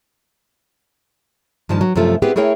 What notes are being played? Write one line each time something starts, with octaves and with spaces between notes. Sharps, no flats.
G2 D#3 F3 A#3 A5
F#3
F#2 C3 F3 A3 F4
B3 C4 E4 G4 G#4 B4
A3 E4 G#4 A#4 C#5 G5